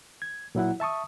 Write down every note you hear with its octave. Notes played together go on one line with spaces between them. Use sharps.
G#6
A#2 F#3 E4 F#5
E5 A5 C#6 D#6